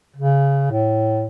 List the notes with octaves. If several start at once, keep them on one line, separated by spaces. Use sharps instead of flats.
C#3
A2